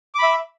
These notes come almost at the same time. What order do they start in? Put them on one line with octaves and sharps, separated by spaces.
D6 B5 E5